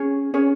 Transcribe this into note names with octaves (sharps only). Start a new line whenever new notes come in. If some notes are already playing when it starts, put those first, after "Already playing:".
Already playing: C#4 G#4 C#5
C#4 G#4 C#5